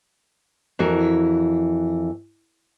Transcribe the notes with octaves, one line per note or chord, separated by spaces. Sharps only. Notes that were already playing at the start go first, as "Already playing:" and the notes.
F2 E3 F#4 A#4